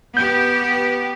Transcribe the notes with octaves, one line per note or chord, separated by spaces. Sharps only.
B3 G4 G6